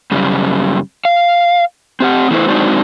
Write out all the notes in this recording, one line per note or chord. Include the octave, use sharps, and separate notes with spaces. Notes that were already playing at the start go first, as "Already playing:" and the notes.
F#2 C#3 G3
F5
C4 G4 F#5
E3 G#3 A3 B3 E4 C5
F#3 G#3 C4 D4 D#4 F#4